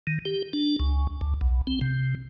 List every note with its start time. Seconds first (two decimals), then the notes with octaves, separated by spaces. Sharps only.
0.07 D#3
0.25 G4
0.53 D4
0.80 C#2
1.21 D2
1.41 B1
1.67 C4
1.81 C3